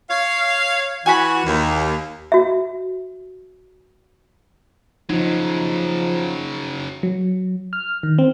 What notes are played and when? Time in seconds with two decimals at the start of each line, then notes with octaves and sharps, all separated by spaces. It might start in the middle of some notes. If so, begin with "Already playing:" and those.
0.10 C#5 F5
1.06 E3 F#4 G#5 B5
1.45 D#2
2.32 F#4 E5
5.10 C#3 F3 F#3 D#4
7.03 F#3
7.73 F6
8.03 D#3
8.18 C4